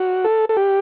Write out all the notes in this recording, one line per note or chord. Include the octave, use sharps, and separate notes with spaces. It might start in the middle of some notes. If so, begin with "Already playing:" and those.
Already playing: F#4
A4
A4
G4